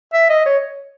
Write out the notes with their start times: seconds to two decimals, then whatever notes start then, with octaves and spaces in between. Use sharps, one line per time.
0.14 E5
0.30 D#5
0.46 C#5